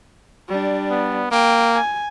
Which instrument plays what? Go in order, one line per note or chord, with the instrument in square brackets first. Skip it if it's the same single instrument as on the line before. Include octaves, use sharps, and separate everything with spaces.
[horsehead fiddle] G3 D4
[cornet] B3
[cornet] A#3 [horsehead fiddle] G5
[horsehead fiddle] G#5